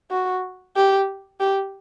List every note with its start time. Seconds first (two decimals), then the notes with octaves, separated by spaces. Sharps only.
0.11 F#4
0.76 G4
1.40 G4